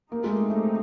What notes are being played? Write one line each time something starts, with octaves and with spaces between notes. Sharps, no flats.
A#3 C4 D#4 G4
G#3
A3
A3